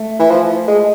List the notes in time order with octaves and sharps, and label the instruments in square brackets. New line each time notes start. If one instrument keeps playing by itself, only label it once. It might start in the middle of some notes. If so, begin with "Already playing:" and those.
Already playing: [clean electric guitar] A3
[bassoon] E3
F3
G#3